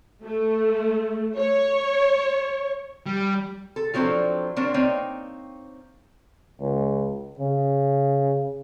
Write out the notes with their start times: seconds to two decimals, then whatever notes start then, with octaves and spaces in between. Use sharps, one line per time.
0.23 A3
1.38 C#5
3.06 G3
3.76 A4
3.94 F3 F#3 C4 D4 A4
4.56 F#3 A#3 C4 D4
4.74 A#3 C4 D#4 C#5
6.61 C#2
7.39 C#3